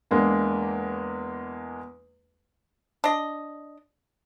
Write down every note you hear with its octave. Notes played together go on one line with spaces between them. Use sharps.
E2 G#3 A#3 D4
D4 D#5